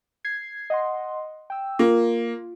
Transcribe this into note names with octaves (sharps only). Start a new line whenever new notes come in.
G#6 C7
D#5 F#5 C6
G5 E6
A#3 F4